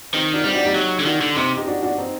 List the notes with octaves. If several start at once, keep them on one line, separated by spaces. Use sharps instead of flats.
D#3 C4 D#4
D4 F#4
G3 C4 D#4
D4 F#4
D#4 G4
F#3
D3
D#3 D4 F#4
D3
C3 C4 D#4
D#4 G4
D4 F#4
D4 F#4
C4 D#4